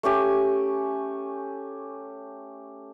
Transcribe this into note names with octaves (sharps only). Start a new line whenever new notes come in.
A3 C#4 G4 G#5